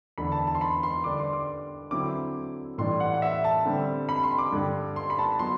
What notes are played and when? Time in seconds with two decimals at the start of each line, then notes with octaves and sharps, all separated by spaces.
0.18 E2 D3 A3 D4 B5
0.32 A5
0.47 A5
0.55 C6
0.61 B5
0.83 C6
1.04 D3 G3 D4 D6
1.20 C6
1.33 D6
1.91 D3 F#3 C4 E4 D6
2.78 A2 E3 G3 D4 C6
3.00 F#5
3.14 F#5
3.22 E5
3.44 A5
3.65 D3 G3 C4
4.09 B5
4.23 C6
4.38 D6
4.52 G2 D3 G3
4.96 C6
5.10 B5
5.19 A5
5.39 F#3 B3 C6